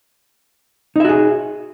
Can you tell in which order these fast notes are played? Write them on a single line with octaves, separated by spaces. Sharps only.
D#4 E5 F#4 G#4